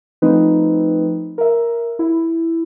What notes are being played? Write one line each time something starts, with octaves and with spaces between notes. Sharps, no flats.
F3 A3 C4 D#4 B4
A#4 E5
E4